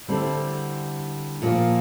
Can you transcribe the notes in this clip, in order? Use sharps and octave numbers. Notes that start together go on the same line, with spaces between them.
D3 G3 C4 E4 A4
A#2 F3 A#3